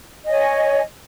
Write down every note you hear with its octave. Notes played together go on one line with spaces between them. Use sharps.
C#5 D#5 G#5